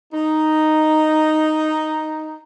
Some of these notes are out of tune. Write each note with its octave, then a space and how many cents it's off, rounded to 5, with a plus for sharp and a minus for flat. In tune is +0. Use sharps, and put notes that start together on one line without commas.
D#4 -5